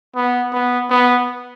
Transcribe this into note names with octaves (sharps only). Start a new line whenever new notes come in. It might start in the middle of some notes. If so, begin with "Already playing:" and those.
B3
B3
B3